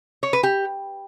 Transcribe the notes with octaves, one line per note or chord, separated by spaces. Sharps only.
C#5
B4
G4